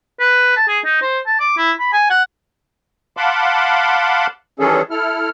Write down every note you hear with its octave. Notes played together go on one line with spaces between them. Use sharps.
B4
A5
G#4
D#4
C5
A5
D6
E4
B5
G#5
F#5
F5 F#5 A5 B5 C6 D6
D#3 E3 G3 C#4 G#4 A4
E4 A4 F6